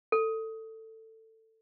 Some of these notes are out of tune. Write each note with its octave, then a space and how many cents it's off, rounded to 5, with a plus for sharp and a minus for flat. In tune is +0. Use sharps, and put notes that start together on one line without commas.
A4 +15